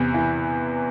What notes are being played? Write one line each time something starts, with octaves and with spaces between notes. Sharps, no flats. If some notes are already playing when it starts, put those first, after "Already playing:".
Already playing: E2 C3
E3